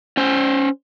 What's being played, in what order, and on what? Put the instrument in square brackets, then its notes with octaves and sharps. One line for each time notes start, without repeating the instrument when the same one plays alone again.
[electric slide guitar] C#4 C5